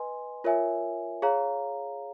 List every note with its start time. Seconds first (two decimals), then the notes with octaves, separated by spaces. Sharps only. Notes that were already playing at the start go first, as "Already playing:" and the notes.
Already playing: B4 D#5 G#5 C6
0.44 F4 A#4 C#5 E5 G#5
1.22 G#4 C#5 F5 A#5